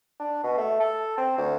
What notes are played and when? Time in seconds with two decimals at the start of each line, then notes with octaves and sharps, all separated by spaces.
0.20 D4
0.44 B2
0.58 A3
0.80 A4
1.18 C4
1.38 D2